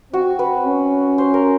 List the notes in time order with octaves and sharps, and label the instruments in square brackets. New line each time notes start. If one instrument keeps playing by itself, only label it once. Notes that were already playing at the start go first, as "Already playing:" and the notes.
[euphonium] C4 [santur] F#4
[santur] B4
[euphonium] C#4
[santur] C5
A#4